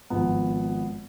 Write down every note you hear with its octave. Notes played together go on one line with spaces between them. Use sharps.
G#1 G#2 F3 B3